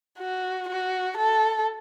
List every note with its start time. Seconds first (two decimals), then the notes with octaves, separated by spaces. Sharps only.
0.19 F#4
0.68 F#4
1.17 A4